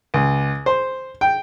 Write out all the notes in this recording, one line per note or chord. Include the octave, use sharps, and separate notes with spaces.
C#2
C5
G5